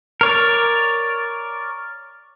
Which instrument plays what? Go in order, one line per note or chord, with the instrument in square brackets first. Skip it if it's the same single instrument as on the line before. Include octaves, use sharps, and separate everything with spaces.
[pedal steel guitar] A#4 C#5 D5